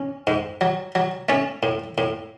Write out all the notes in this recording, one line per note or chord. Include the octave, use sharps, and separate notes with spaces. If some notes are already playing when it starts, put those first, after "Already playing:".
Already playing: C#4
G#2
F#3
F#3
A3 C#4
A2
A2